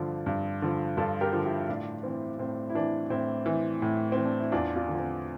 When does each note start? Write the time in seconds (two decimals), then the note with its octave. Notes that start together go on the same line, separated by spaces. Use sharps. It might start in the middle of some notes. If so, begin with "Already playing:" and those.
Already playing: G2 D3 F3 D4
0.26 G2
0.62 D3 F3
0.97 G2 F4 A4
1.21 G4 A#4
1.32 D3 F3
1.45 E4 G4
1.68 A2 D4 F4
2.03 E3 C4 E4
2.39 A2 C4
2.69 E4
2.75 E3 D4
3.10 A2 C4 E4
3.46 E3
3.82 A2
4.12 E3 C4
4.25 D4
4.39 E4
4.52 E2 D4 F4
4.76 D4 F4
4.88 D3 F3
5.00 C4